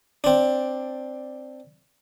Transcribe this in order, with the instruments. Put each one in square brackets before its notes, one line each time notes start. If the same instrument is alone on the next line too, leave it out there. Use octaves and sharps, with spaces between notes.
[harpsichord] C4 D4